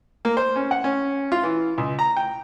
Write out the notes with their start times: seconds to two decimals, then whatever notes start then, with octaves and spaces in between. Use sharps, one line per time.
0.25 A#3
0.37 C5
0.56 C#4
0.71 F#5
0.84 C#4
1.32 F4
1.43 E3
1.78 C#2
1.99 A#5
2.17 G5